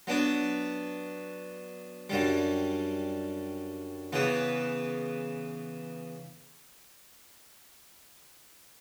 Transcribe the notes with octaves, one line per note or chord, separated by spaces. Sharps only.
F#3 B3 D4
F#2 D3 G3
C#3 E3 B3